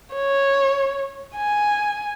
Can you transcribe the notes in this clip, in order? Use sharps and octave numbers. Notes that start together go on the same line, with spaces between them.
C#5
G#5